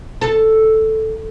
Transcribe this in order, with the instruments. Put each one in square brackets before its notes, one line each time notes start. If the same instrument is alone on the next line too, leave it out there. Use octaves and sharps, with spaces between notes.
[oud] A4